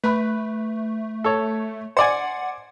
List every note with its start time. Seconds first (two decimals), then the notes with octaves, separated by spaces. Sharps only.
0.04 A3 B4 B5
1.24 A4 C#5
1.97 C5 D5 F#5 G#5